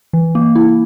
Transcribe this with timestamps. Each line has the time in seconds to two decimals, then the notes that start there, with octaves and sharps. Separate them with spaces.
0.13 E3
0.35 A#3
0.56 E4